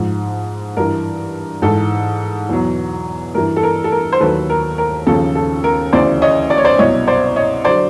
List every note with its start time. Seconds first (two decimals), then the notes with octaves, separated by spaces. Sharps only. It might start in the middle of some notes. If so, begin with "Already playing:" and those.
Already playing: G#2 F3
0.77 G2 E3 A#4
1.62 G#2 E3 A4
2.49 E2 B2 F#3
3.35 G2 E3 A#4
3.56 A4
3.63 A#4
3.84 A4
3.92 A#4
4.12 C5
4.20 D#2 D#3 F#3 A4 B4
4.50 A#4
4.78 A#4
5.07 D#2 C#3 F3 A4
5.35 A4
5.64 A#4
5.93 D2 C#3 E3 C5 D5
6.22 C#5 D#5
6.50 D5
6.58 C#5
6.65 C5 D5
6.79 C2 B2 F#3 C#5 D#5
7.07 C5 D5
7.36 C#5 D#5
7.65 D3 F#3 C5 D5